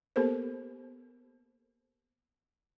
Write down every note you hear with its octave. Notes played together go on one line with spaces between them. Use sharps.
A#3 B3 G4 A4 A#4 C5